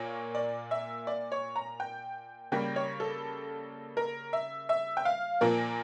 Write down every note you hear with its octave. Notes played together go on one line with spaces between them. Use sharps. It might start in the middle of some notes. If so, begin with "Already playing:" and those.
Already playing: A#2 A#3 C#5
D5
E5
D5
C#5
A#5
G5
C#3 G3 A#3 G5
C#5
A4
A#4
E5
E5
G5
F5
A#2 F3 A#3 A#4